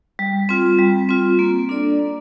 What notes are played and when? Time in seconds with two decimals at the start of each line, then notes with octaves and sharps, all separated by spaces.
0.19 G3
0.49 C4 F4
0.79 G3
1.09 C4 F4
1.39 A#3
1.69 D4 A4 D5
1.99 A#3